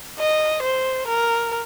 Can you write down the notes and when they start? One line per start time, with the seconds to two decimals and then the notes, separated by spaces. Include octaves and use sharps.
0.18 D#5
0.63 C5
1.08 A#4